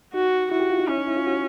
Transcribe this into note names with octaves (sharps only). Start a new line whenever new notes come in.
D#4 F#4
E4 F#4
G4
F4
D#4
C#4 E4
D#4
E4
F4
F#4